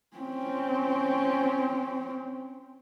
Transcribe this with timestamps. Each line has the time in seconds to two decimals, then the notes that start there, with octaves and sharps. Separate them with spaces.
0.17 C4 C#4